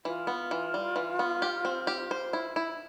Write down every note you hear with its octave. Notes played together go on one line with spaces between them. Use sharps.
E3 F4
B3
E3
G3
E3
B3
G4
C4
G4
C5
E4
E4